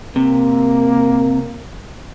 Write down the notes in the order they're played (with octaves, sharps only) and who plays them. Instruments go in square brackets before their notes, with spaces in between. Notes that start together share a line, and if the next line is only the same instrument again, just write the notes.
[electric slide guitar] C3 [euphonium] A#3